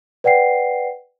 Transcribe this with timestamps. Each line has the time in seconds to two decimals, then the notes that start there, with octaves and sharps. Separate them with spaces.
0.24 B4 D5 F#5 G5 C7